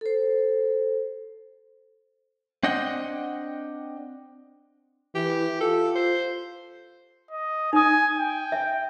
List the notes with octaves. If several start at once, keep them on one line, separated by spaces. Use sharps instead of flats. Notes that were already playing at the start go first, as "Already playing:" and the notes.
A4 C5
C4 D4 D#5 F#5 G5
E3 G4
F4 A4
C5
D#5
D#4 G#5 D#6
G5
E5